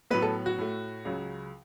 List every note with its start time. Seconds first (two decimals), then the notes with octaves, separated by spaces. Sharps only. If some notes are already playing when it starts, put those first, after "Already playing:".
0.10 A2 F#3 B3 B4
0.22 A4
0.46 F#4
0.58 A2 A3
1.05 C#2 C#3 F#3